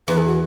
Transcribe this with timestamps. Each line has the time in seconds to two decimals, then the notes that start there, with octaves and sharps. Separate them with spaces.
0.08 E2 B4
0.18 G#4
0.27 F#4